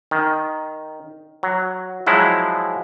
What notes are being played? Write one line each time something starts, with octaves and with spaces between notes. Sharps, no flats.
D#3
F#3
F3 F#3 G#3 E4